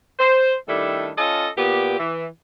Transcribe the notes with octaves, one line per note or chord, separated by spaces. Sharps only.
C5
D#3 G3 A3 D4 E4 A4
C#4 F4 A4 D#5 A5
A#2 B3 G4
E3